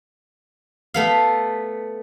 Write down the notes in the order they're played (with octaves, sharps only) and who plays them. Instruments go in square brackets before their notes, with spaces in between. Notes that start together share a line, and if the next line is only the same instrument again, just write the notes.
[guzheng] A3 B3 F5